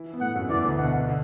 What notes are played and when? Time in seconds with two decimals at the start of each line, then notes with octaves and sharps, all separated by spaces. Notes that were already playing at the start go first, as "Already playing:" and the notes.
Already playing: E3 E4
0.13 B3
0.21 A2 A3 F#5
0.36 F#2 F#3
0.50 E2 E3 D5
0.64 D2 D3
0.78 B2 F#5
0.93 B2
1.08 D3